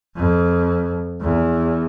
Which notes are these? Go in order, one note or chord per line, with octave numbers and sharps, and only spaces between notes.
F2
E2